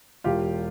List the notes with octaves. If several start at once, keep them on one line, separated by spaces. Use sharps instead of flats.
E1 F4 G4